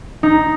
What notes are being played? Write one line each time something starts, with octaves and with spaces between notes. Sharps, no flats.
D#4